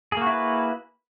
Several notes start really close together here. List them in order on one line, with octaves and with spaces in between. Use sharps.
G#4 A#3 F#4 E4 B4